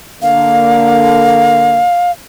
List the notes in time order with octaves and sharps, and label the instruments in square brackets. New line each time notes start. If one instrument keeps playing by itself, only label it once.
[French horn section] D3 A#3 [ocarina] F5